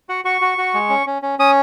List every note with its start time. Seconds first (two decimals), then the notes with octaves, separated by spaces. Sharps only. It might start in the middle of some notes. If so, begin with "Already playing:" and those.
0.09 F#4 F#5
0.24 F#4 C#6
0.41 F#4
0.58 F#4
0.74 G#3
0.90 C#4
1.07 C#4
1.22 C#4
1.39 C#4 D#6